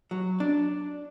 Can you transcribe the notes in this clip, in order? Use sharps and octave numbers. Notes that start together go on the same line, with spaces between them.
F#3
D4